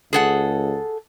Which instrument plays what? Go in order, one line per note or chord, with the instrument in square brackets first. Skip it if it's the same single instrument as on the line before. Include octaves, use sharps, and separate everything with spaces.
[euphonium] C#2 [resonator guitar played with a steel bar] G#4 A4 F#5